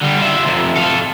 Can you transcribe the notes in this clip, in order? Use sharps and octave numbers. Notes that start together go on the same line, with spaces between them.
D3 G3
F4 E5
F2 C3
A4 F5